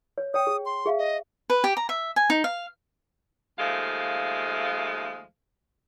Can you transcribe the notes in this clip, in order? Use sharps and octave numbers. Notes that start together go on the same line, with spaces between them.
C#5
C#5 G5 D#6
G#4
C6
G#4 E5 F5
D#5
B4
G4
A#5
E5
G#5
D#4
F5
D#2 F3 G#3 A3 F5